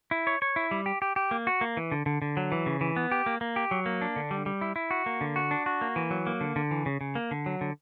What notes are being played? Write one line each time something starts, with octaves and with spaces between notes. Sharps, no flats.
E4
C#5
C#5
E4
G3
G4
G4
G4
A#3
F#4
A#3
E3
D3
D3
D3
F#3
E3
C#3
E3
B3
G4
A#3
A#3
G4
F#3
A#3
D4
D3
G3
G3
E4
E4
F#4
A#3
D3
F#4
D4
F#4
A#3
E3
F#3
A#3
D3
D3
E3
C#3
C#3
A#3
D3
F#3
D3